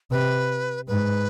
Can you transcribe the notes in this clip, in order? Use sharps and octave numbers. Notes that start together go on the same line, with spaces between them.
C3 B4
G#2 B4